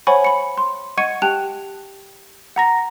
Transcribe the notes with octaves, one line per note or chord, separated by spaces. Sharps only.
C5 C#5 F#5 G#5 B5 C#6
B5 C#7
C6
D#5 F#5 C#6 G#6 C#7 D#7
G4 G5 A5 F#6 F7
F#5 A#5 A#6